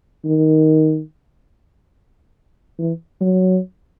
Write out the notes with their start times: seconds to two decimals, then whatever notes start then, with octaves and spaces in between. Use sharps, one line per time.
0.25 D#3
2.79 E3
3.21 F#3